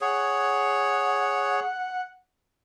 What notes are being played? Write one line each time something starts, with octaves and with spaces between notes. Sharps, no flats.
G#4 C#5 F#5